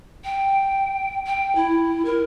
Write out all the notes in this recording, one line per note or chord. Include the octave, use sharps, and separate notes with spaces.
G5
G5
E4
A#4